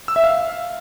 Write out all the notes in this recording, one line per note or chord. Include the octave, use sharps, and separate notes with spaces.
E6
E5
F5